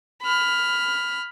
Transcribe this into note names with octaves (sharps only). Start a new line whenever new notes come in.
B5 F6